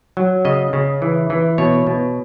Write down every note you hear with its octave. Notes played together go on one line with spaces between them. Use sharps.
F#3
C#3 D#5
C#3
E3
E3
B2 C#5
B2